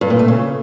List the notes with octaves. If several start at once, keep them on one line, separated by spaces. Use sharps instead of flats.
G2
A#2
A3
C#3